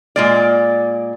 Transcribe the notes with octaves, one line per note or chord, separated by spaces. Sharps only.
A#2 G#3 D5